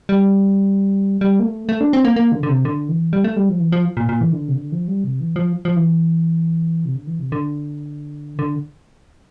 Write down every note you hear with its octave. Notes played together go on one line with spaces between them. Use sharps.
G3
G3
A#3
A3
A3
D4
C4
A#3
A#3
D3
D3
C3
D3
E3
G3
A3
G3
F3
E3
F3
A#2
A#2
E3
D3
C3
D3
F3
G3
C3
E3
F3
F3
E3
C3
D3
E3
C3
D3
D3